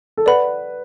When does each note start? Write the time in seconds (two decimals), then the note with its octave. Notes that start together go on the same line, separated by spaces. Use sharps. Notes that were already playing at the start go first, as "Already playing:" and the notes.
0.17 A4
0.26 B4 D5 F#5 B5